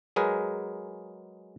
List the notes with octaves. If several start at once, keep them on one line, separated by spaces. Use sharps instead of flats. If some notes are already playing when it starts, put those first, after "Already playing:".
F#3 G#3 G#4 A#4 B4